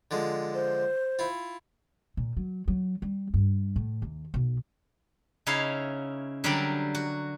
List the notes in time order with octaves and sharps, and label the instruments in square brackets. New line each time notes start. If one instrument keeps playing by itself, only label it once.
[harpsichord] D3 F3 G#3
[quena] C5
[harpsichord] E4 F4
[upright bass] A#2
F#3
F#3
G3
G2
A2
D#2
B1
[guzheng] C#3 D#4 E4 C#5 F5
D3 F#3 G3 G4 A#4 D5
F#4